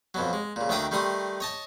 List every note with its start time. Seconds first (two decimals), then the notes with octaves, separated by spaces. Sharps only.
0.14 F2 B2 F#3
0.33 G#3
0.56 A#2 C#3
0.69 D2 D#3 D4 E5 G5 D#6
0.91 D#3 G3 A3 C6 D#6
1.40 C#5 D#5 A5